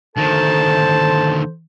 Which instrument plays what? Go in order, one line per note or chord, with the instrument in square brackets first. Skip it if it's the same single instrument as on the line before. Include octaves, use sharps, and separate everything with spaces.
[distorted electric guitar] D2 D#3 [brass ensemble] A4 C5 [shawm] A5